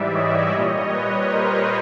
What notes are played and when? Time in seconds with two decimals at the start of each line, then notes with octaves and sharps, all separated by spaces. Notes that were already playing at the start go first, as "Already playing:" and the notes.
Already playing: G#2 E3 G3 D5 E5
0.13 C#5 D#5
0.52 A#2 G3 C#5 D#5
0.92 B4 C#5
1.31 A#4 C5